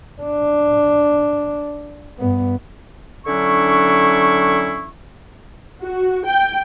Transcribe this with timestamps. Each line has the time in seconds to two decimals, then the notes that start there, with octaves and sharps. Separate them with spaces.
0.22 D4
2.19 G2 B3
3.26 D3 F#3 C#4 D4 E4 C#6
5.83 F#4
6.26 G5